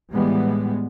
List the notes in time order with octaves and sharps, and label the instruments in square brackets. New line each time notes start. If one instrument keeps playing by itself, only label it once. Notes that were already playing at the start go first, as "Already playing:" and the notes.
[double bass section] A2 E3 G3 G#3 B3